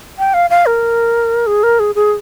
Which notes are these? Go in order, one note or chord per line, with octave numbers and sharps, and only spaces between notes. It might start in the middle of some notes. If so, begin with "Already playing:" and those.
G5
F5
F5
A#4
G#4
A#4
G#4
G#4